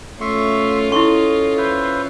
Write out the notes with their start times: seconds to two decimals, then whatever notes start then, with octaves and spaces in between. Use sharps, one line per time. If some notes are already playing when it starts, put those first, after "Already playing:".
0.21 A3 C#4 F4 E5 C6 C#6
0.92 E4 A4 D#5 C6 C#6
1.58 B4 C5 E5